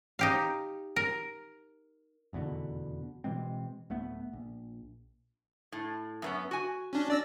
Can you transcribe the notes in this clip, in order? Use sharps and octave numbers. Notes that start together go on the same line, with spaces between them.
D#4 G4 F5
A#4
F1 E2 B2 D3
B2 E3 G#3 C4
D1 A3 B3
A#1
A2
F#2 B3 C#4
F#4 G#5
C#4 D4
D5 E6 A#6